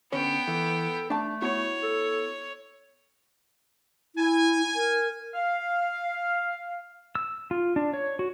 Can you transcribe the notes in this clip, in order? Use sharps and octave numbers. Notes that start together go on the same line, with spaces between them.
D3 B3 C#4 C#5 G5
E3 A4
A3 D4 A5
B3 E4 F#4 C#5
A4
E4 G#5
A#4
F5
E6
F4
D4
C#5
F#4